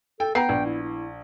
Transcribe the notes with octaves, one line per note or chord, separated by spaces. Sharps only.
A4 G5
B3 G5 A#5 C7
A#1
E4
E4